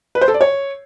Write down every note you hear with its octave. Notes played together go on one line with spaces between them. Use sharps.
B4
C5
A4
D5
C#5